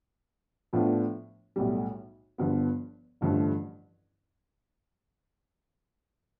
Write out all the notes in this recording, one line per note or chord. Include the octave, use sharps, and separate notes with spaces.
A2 F3 B3 D4 F4
B1 A2 G3
G1 G2 F3 B3
A1 G2 D3 F3 A3